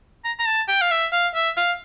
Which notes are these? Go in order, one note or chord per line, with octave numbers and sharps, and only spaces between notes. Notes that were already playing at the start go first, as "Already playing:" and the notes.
A#5
A#5
A5
G5
F5
E5
F5
E5
F5